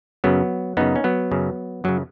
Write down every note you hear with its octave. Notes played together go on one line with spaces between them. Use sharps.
F#2 C#3 F#3 B3
F#2 C#3 B3 D#4
C#4
F#3 B3
F#2 C#3
F#2 C#3 F#3